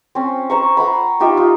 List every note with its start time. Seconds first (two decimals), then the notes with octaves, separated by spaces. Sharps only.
0.15 C4 C#4
0.50 C5 A#5 C#6
0.77 F#5 A#5 B5
1.20 D#4 F4 G4 E5
1.37 F4